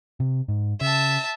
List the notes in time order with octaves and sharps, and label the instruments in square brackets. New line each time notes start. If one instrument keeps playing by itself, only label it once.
[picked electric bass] C3
G#2
[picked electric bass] C#3 [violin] E5 A5